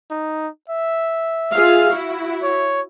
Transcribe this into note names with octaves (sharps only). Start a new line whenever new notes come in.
D#4
E5
F4 G#4 F5
E4 F#4
C#5